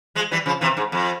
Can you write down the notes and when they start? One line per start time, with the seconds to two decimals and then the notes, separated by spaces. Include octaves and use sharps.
0.15 F3 G#3
0.31 E3 G3
0.46 C#3 F3
0.61 C3 E3
0.77 G#2
0.92 F2